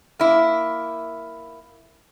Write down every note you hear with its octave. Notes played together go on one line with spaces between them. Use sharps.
A#3 E4